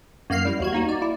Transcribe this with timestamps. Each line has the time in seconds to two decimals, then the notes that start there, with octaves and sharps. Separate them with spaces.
0.30 F#2 A#3 F5 F6 C7
0.45 G3 E4
0.60 D#2 F#4 G#6
0.73 A#3 D#4 F#4
0.89 D5
1.02 E4